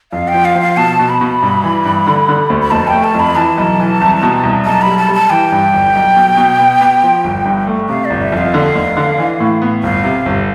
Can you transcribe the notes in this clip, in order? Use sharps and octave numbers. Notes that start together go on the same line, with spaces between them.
F2 F5
G5
F3
F5
F3
F5
B2 A5
B2
B5
B2
G2
E3
G2
D3
D3
D2
B5
F1 A5
G5
A3
A5
F2
B5
E3 A5
B1
E3
C2
B2
C2
B1 A5
G3 B5
A5
G3
A5
E3 G5
G2
G1
B1
B2
B2
B3
B3
F3
G1
G2
A3
C3 F5
D5
G1
E5
F2
F5
D3
F1
D3
E3
A2
B3
G1 F5
C3
G1